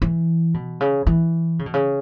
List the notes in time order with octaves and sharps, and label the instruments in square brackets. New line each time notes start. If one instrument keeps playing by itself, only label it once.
[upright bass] E3
B2
C#3
E3
C#3
B2
C#3